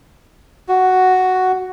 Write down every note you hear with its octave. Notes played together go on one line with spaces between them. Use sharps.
F#4